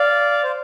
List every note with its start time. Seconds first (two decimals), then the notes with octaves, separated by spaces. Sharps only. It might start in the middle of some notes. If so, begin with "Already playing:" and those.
Already playing: D5 F5
0.43 C5